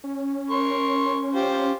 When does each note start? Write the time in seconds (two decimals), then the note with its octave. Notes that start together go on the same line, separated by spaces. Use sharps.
0.04 C#4
0.50 A#4 C6 C#6
1.35 F4 G4 C5